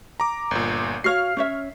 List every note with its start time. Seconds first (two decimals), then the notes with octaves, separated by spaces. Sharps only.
0.20 A#5 D6
0.51 G1 A#2
1.04 F#4 C#5 F5 F6 C7
1.37 C#4 C#5 E5